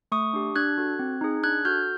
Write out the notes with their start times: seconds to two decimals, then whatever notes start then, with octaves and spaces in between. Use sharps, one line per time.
0.12 A3 C#6 D#6
0.33 D4 G4
0.56 D4 F#6 G#6
0.78 F#4 A4
0.99 C4
1.21 D#4 G#4
1.43 D4 F#6 G#6
1.65 F#4 A4 F6 G6